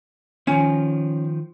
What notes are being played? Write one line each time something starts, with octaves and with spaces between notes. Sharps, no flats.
D#3 F3 C#4